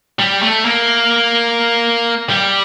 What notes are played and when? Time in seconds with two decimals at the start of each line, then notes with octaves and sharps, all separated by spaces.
0.19 G3
0.42 A3
0.65 A#3
2.30 G3